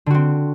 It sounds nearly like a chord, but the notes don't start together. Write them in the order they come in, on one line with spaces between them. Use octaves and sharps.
D3 F#4 C4